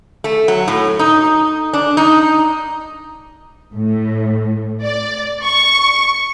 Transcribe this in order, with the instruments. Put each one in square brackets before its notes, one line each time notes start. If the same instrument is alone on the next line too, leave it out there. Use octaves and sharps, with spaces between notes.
[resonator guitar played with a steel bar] A3
F#3
A2
D#4
D4
D#4
[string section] A2
D5
C#6